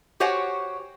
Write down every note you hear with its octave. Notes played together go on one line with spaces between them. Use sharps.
F#4 G4 C5 C#5 F#5 G#5